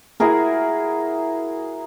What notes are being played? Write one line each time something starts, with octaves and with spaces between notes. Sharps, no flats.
E4 F#4 G#4 A#4